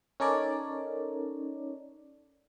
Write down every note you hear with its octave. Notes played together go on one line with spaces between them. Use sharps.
C#4 D#4 A4 A#4 C#5 D5